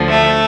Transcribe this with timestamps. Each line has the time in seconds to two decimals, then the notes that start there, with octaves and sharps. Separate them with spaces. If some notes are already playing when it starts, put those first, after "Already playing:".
Already playing: D2 D3 F3
0.10 A3